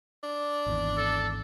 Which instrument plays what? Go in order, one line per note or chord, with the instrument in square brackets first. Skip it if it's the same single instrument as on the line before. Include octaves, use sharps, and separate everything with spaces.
[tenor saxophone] D4
[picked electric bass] G#1 E2
[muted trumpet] A4